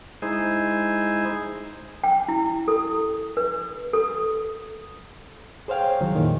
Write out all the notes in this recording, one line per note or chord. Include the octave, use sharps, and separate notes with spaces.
G#3 D#4 E4 G#4 C5
G5
E4
A4
B4
A4
G#4 C5 C#5 F5 G5
C2 D#3 F#3
F2 A#2 D#3 E3